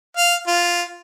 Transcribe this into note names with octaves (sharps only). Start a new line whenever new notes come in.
F5
F4